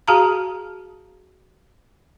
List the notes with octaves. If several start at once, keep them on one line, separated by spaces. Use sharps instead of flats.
F#4 G#4 F5 A5 A#5